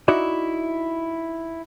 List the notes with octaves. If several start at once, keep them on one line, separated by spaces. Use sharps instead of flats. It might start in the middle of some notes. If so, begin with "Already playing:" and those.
D#4 E4 F#4 D5 E5